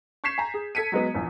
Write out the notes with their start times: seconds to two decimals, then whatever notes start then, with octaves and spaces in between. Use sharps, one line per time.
0.24 C#6 G6 G#6 B6 C7 E7
0.38 G#5 A#5
0.54 G#4
0.75 A4 G#6 B6 C#7 D#7
0.92 F#3 G#3 B3
1.15 A#1 E2